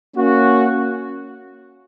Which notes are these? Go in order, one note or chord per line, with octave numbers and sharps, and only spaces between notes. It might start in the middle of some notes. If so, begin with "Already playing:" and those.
A#3 C#4 F#4